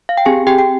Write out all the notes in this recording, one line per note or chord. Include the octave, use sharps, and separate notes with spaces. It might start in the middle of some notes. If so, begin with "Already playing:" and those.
F5
G5
C4 G4 G#4 G#5
G4 G5
G5